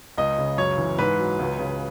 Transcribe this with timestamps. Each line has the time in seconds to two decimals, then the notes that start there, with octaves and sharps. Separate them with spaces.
0.18 C#2 D#5
0.38 C#3
0.58 F#2 C#5
0.78 E3
0.98 G#2 B4
1.19 F#3
1.39 C#2
1.59 C#3